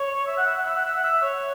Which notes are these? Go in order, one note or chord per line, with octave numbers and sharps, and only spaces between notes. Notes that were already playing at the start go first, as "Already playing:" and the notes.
Already playing: C#5
E5
F#5
E5
F#5
E5
F#5
E5
F#5
E5
C#5